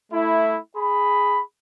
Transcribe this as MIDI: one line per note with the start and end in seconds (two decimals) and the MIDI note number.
0.12 0.58 57
0.12 0.58 64
0.76 1.41 68
0.76 1.41 83